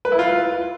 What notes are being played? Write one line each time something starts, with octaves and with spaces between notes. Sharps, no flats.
B4
E4
F4